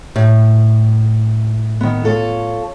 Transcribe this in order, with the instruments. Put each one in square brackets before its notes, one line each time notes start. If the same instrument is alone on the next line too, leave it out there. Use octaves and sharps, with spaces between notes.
[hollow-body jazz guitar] A2
[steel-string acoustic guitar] D#3 B3
F4 A4 C#5